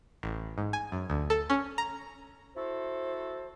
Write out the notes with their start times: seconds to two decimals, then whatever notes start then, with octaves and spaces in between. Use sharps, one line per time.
0.23 A1
0.58 G#2
0.73 G#5
0.92 F#2
1.10 D2
1.30 A4
1.50 C#4
1.78 A#5
2.56 E4 F#4 A4 C5